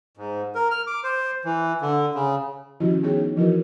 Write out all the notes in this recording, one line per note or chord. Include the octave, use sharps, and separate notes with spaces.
G#2
A#4
F6
D6
C5
E3
D3
C#3
D#3 F3 C#4 E4 F#4 G4
B3 D#4 G#4 C#5 G5
E3 F3 E4 F#4 A#4 B4